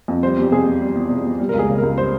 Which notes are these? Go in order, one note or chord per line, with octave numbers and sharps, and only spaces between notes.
F2
G3 C5
E2 G4
C3 G#4
E2
G3
E2
C3
E2
G3
C#2 A#4
G#4
C#3
C#2 A#4
G3 C5